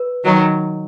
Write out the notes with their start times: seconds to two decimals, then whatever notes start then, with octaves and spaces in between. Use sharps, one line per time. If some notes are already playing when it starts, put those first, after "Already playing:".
Already playing: B4
0.24 D#3 F#3